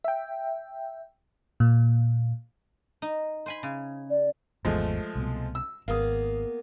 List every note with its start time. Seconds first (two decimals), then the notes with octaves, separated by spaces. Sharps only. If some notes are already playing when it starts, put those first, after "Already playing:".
0.04 E5 G5
1.60 A#2
3.02 D#4
3.46 C5 G#5 B5
3.63 C#3
4.09 D5
4.65 G#1 E2 F3 G#3 A3
5.15 C2 B2
5.55 E6
5.88 G#1 A#3 B3 G#4 F5 D#6